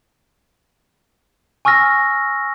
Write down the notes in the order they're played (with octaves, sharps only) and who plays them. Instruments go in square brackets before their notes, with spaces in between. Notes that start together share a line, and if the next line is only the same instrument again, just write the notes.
[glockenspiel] G#5 C#6 E6 F6 A#6